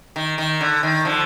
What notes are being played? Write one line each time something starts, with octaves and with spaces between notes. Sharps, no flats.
D#3
D#3
D3
D#3
D3 F3